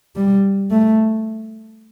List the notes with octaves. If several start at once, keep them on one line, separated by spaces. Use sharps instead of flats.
G3
A3